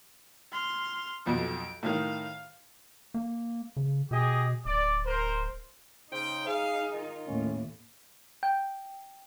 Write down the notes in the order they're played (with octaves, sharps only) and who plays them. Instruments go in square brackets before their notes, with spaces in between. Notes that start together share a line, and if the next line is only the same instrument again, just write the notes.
[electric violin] C6 F6
[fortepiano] B1 F2 B2 [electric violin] D7
[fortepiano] A2 D#3 [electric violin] F5
[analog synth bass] A#3
C#3
[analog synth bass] B2 [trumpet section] G4 G#4 D#5
[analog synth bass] D1 [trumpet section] D5
[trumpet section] A#4 C5
[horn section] C#3 G5 [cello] D#4 [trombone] C5
[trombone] G#4 [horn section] F5
[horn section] D#3 F4
[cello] D#2 A2 [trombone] C#4
[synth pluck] G5